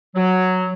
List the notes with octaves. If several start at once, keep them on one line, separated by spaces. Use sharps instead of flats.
F#3